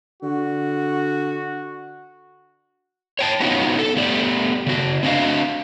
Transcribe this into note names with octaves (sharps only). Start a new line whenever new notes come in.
D3 F#4
C#5 G5 A5
B3 C#4 D#4 F4 F#4
A4
A3 B3 G4 D5
C#3 F#4
C4 D4 F#4 D#5 F5